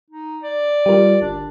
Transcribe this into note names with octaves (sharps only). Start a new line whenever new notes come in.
D#4
D5
G3 F4 G4 A#4
G1 D4